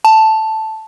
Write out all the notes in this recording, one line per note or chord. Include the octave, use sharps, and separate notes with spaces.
A5